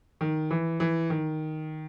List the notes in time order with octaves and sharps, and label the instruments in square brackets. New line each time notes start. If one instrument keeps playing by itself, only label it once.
[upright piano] D#3
E3
E3
D#3